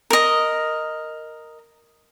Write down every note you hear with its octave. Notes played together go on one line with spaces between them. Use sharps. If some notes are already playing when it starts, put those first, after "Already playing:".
A#4 D#5